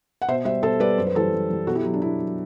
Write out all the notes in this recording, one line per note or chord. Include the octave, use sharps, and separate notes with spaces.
F#5
B2 C5 E5
G3 C5 E5
B2 A4 C5
G3 B4 D5
F#2 C5
B4
E3 G3 A4 C5
F#2
E3 G3
B2 F#4 A4
E4 G4
F#3
D4
B2 E4
F#3